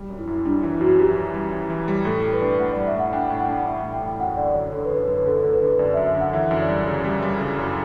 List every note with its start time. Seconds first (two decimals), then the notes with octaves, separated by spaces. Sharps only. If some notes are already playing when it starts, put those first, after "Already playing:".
Already playing: G3
0.10 F#2
0.19 E4
0.27 F#2
0.45 G3 D4
0.63 E3 E4
0.81 F#2 F#4
0.99 E3 G4
1.16 E3
1.34 G3
1.52 E3
1.70 E3
1.88 G3
2.05 A2 A4
2.23 G3
2.33 B4
2.42 D4
2.59 A2 F#5
2.72 G3 D5
2.86 E5
2.95 A2 F#5
3.13 D4 G5
3.30 A2
3.39 F#5
3.48 D4
3.66 D4 E5
3.83 A2
3.93 G5
4.02 A2
4.19 F#2 F#5
4.37 D3 D5
4.54 F#2 C#5
4.72 D3 A4
4.85 B4
4.90 F#2 C#5
5.08 F#2 B4
5.26 D3 A4
5.44 D3
5.53 B4
5.61 D3
5.79 F#2 D5
5.94 E5
5.97 F#2
6.06 E5
6.15 D3
6.20 F#5
6.33 E3 E5
6.51 F#2
6.60 D5
6.69 G3
6.87 C#3
7.04 G3
7.22 G3
7.40 C#3
7.58 F#2